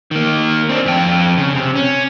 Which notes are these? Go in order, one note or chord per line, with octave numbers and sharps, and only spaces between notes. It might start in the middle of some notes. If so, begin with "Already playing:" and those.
D#3 A#3
C4 D4
F2 G5
C#3
C3
C#4